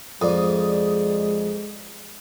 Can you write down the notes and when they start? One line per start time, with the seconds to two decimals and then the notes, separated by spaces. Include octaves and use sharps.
0.22 F2 G#3 D5 D#6